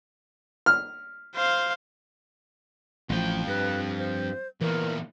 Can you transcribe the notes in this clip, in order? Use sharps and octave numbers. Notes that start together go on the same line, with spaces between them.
F6
C5 F5
A1 F2 F3 G5
G2 B4
C5
E2 A#2 E3 A#4